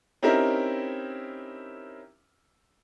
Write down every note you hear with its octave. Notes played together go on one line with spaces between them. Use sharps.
C4 C#4 D#4 E4 G4 A#4